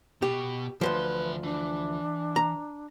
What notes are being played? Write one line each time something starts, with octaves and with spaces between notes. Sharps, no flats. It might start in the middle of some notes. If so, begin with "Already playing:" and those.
B2 B3 G4
D2 G2 E3 F3 B4 C6
E3 D4
A#5